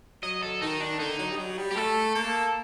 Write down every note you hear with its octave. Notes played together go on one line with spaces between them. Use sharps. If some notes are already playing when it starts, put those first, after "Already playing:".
F#3 D#5
A4
D#3 D#4
D4
D3 D#4
F#3
G3
F#3
G3
G4
A3 A4
A#3